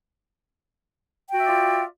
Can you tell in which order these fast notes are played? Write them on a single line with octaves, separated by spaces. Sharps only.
G5 F#4 E5 D5 F4